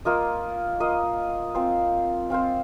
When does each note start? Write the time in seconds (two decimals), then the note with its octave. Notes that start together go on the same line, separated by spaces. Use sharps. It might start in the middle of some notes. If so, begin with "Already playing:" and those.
0.05 A#3 F4 D#5
0.80 A#3 F4 D#5
1.55 C4 F4 C5
2.30 C4 F4 C5